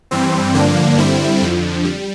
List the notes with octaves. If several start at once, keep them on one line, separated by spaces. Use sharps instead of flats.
G2 E3 G3 C4
G2 D3 F3 A#3 D4
G2 D3 G3 C4 E4
F2 D3 F3
G3